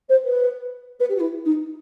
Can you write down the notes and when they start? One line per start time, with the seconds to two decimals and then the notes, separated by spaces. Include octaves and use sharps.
0.09 C5
0.24 B4
0.99 B4
1.09 G4
1.15 F#4
1.20 E4
1.45 D#4